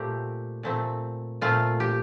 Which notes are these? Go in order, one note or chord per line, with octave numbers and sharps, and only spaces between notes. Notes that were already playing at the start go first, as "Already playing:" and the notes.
Already playing: A#2 A3 C4 G4
A#2 A3 C4
A#2 A3 C4 F4
G4